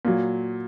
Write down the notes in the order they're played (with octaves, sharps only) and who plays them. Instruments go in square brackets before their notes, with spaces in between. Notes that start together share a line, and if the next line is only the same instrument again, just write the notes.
[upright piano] A#2 F#3